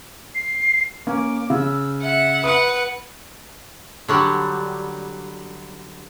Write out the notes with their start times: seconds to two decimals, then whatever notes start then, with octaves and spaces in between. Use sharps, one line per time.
0.35 C7
1.07 A#3 C#4 D6
1.50 C#3 E6
2.03 E5 F#5
2.44 B4 F#5 D#6 C#7
4.08 D3 F#3 G3